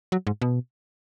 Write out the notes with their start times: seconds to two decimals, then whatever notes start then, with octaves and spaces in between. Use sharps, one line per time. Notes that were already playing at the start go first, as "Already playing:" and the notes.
0.12 F#3
0.27 G#2
0.42 B2